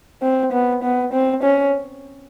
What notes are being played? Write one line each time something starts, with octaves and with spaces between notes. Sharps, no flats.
C4
B3
B3
C4
C#4